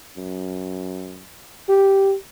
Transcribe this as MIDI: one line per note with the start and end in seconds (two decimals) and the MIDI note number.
0.17 1.27 42
1.69 2.15 67